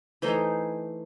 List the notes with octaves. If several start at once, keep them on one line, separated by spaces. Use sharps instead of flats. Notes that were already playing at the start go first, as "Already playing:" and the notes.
E3 A3 D#4 C5